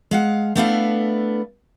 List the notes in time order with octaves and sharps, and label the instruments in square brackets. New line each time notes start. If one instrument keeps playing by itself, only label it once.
[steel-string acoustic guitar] G#3 F5 F#5
A3 B3 D4 E4 A4 F5